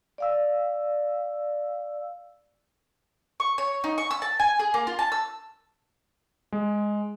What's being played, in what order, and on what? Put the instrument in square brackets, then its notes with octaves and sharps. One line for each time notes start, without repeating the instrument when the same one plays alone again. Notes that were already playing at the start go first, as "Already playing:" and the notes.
[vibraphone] D5 F5 E6
[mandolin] C#6
C#5
D#4
C#6
E6
A5
G#5
G#4
A#3
F4
A5
E6
[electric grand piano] G#3